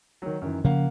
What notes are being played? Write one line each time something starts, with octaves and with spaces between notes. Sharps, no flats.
D#3 F#3
F#2 D#3 E3
C#3 F3 A#3 C#4 F5 F#5